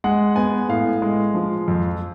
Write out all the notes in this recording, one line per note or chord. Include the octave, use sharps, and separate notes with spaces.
G#3 F#5
B3 G#5
A2 F5
G#3
F3
F2